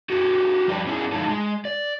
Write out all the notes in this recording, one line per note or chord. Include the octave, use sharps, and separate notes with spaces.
F#4 G4 A4
F3 G3 G4 B4 D5
B3 C#4 E4 G4 G#4
D3 F3 G#3 D#4 E4 A4
G#3
D5